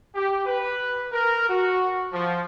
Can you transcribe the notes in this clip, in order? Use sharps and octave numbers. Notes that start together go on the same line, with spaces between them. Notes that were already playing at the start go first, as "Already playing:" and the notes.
G4
B4
A#4
F#4
F3